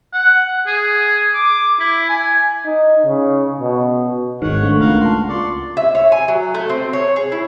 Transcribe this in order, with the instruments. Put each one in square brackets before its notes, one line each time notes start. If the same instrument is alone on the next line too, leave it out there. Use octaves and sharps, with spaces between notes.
[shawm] F#5
G#4
D6
E4
G#5
[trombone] D#4
C#3
B2
[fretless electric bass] G#1 G#2 [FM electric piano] D#3 [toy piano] B4 [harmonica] C#5 F#5
[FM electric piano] A3 [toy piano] D4 F5 C#6
[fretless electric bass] C#2 A#3 [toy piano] F4 A#5 [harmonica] A#4 F5 F#5
[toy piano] F#5 A5 [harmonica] C6
[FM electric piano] F4 C#6 [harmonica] D5 C6
[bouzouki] E5
C#5
G#5
F#3
A3
C4
C#5
G#4
E4